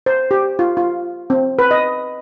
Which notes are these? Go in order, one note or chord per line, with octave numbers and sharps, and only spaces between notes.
C5
G4
F4
F4
C4
B4
D#5